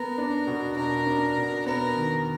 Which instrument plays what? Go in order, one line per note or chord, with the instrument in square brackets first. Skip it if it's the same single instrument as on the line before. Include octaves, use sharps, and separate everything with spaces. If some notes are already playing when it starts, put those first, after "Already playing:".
Already playing: [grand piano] B3 [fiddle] A#4
[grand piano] D4
B2
[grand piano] D4 [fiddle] A#4
[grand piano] D4
B2
[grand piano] B3 [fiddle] A#4
[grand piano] D#3